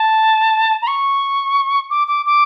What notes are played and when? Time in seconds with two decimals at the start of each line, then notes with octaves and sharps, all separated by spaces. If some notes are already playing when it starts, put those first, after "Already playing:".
Already playing: A5
0.82 A#5
0.87 C#6
1.90 D6
2.07 D6
2.26 D6